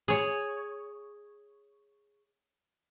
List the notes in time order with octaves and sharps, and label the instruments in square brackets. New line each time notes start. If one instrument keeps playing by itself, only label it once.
[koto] G#4 C#5